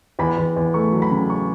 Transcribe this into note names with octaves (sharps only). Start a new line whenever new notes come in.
E2 B5
E2
E2
A3 C#6
F#3
B5
C#3
C#6